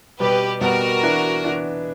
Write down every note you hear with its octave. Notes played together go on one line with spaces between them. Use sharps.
B2 G3 B3 G4 B4
B2 G3 B3 F#4 A#4
E3 B3 D4
E3 B3 D4